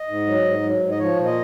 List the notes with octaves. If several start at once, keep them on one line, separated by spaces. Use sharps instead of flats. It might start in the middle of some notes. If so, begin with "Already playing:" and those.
Already playing: D#5
G#2
F#3
G#2
F#3
G#2
D#5
F3 C#5
A#2
D#5